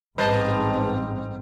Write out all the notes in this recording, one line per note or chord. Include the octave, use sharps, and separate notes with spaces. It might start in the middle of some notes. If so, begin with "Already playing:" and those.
A1 G#2 G3 C4 B4 C5 D#5 A5